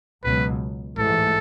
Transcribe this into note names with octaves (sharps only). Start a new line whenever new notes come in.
C#2 B2 F#3 B4
A1 G#2 E3 A3 A4